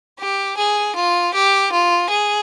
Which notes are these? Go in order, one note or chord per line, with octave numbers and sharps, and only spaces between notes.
G4
G#4
F4
G4
F4
G#4